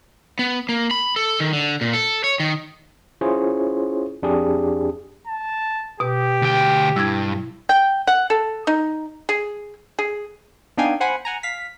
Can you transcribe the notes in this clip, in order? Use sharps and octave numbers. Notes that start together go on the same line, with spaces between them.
B3
A#3
B5
A4
D#3
D3
A#2
A4
C#5
D#3
C#4 E4 F4 G#4 C5 C#5
F2 D4 G4 G#4
A5
B2 G4 D#6
D2 G5
G2 E4 G#6
G5
F#5
A4
D#4
G#4
G#4
B3 D4 D#4 F5 G5 G#5
C5 F#5 G#5 B5
F#5 G#5 A#5
F5 B6